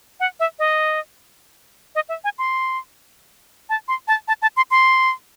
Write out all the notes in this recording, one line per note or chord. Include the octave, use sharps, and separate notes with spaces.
F#5
E5
D#5
D#5
E5
G#5
C6
A5
C6
A5
A5
A5
C6
C6